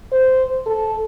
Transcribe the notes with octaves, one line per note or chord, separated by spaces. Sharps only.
C5
A4